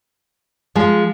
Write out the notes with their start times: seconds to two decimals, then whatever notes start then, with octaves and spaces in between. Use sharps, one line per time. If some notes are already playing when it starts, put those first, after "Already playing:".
0.75 F3 G#3